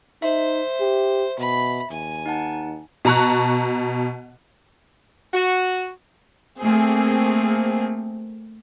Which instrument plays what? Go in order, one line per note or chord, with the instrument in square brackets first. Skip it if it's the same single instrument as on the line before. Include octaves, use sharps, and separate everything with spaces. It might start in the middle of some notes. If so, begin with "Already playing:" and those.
[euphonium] D#4 [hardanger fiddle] C5 [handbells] E5
[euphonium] G4
[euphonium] B2 [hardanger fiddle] B5
[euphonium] D#2 [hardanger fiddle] G#5
[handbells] D#4 F#5 A5
[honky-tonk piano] B2 A5 A#5 C#6 F#6
[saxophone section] F#4
[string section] A3 A#3 C4 G#4